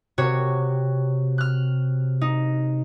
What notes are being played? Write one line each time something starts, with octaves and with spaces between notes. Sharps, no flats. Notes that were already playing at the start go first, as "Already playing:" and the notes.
C3 F#4 C#5
F6 F#6
D#4